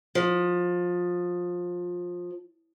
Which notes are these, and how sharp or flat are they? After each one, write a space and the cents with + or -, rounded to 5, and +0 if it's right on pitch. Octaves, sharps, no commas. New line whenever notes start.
F3 +20